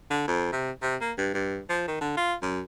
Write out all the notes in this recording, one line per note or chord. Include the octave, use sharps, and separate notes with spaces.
D3
F2
C3
C3
A#3
G2
G2
F3
D#3
D3
F4
F#2